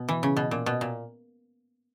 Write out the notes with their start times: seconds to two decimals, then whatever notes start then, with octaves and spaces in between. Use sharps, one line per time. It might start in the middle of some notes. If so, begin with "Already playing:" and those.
Already playing: B2
0.09 E3
0.23 C#3
0.37 B2
0.51 A#2
0.66 B2
0.81 A#2